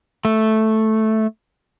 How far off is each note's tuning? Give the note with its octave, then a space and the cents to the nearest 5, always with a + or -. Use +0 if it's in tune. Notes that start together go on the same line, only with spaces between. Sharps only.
A3 -5